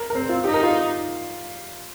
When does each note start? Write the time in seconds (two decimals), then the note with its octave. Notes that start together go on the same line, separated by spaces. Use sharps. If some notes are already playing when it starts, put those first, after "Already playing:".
Already playing: A#4
0.10 A#4
0.15 C4 C5
0.29 F4
0.44 D#4 G4
0.54 A#4
0.63 F4